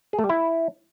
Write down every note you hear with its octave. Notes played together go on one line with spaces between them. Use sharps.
G#4
A3
G3
E4